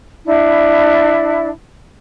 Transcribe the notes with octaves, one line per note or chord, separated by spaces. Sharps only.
D4 E4